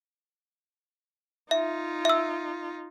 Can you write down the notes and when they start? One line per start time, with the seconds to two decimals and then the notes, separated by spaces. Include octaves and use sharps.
1.51 D#4 F4 E5
2.05 E5 E6